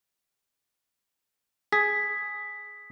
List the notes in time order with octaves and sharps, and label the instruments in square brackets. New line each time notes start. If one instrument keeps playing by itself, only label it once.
[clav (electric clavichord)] G#4 [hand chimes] B6